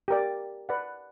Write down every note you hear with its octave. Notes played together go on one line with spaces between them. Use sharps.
G4 A#4 D5
B4 D5 F#5